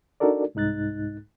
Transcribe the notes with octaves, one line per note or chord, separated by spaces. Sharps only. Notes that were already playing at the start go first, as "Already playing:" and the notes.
D4 D#4 F#4 A4 A#4 D5
C2 G#2 D#4 F#6 A6